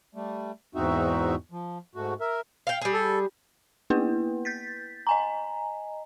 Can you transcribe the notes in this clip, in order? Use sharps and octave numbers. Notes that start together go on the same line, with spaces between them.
G3 A3
E2 G#2 C4 D#4 F#4 E5
F3
G#2 A3 F#4
A#4 E5
F5 G5
G3 G#4
A4
A#3 B3 E4 B4
G6 A6 B6
D#5 G#5 A#5